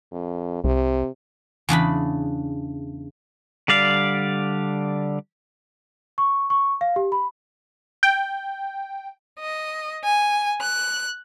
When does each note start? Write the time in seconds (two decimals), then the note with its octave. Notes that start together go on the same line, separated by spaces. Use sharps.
0.12 F2
0.64 C2 C3
1.69 E2 C#3 D4 B5
3.68 D3 G3 D5 F5
6.18 C#6
6.50 C#6
6.81 F5
6.96 G4
7.12 B5
8.03 G5
9.39 D#5
10.04 G#5
10.61 F#6